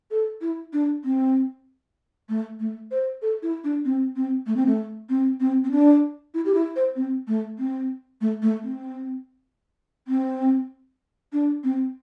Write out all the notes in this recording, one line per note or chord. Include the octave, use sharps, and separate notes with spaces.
A4
E4
D4
C4
A3
A3
C5
A4
E4
D4
C4
C4
A3
C4
A3
C4
C4
C4
D4
E4
G4
E4
C5
C4
A3
C4
A3
A3
C4
C4
D4
C4